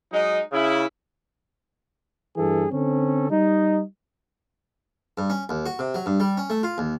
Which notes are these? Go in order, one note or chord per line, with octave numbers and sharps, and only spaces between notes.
F#3 G#3 D#4
C#3 E4
G2 E3 G#4 A4
D3 C4 C#4 A4
G3 D#4
G2
C#4
D#2
F#4
C3
F#3
G2
G3
C#4
A3
F4
D#2